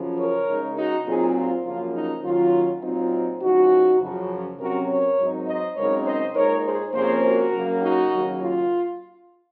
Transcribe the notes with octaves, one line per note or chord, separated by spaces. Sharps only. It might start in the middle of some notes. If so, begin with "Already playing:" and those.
Already playing: F#2 C#3 F3
A#4 C#5
C#3 G#3 D#4
D#4 F#4
A#2 F#3 C4 D#4 F4 G#4
F4
F#2 C#3 F3 A#3 C#4 F4
D#4
D#2 D#3 F#3 C#4 F4
A#2 F#3 C4 D#4 F4
C#3 F3 G#3 D#4 F#4
F#2 C#3 F3
C3 F#3 C#4 F#4 A#4
A#4 C#5
G#2 F#3 C4 D#4
C5 D#5
F#2 C#3 G#3 C4 D#4 A#4 C#5
C5 D#5
A#2 G#3 D#4 A#4 C#5
G#4 C5
C3 F3 A#3 C#4 G#4 C5
F#4 A#4
F#2 C#3 F#3 A#3
D#4 F#4
D#2 C#3 F#3 A#3
F4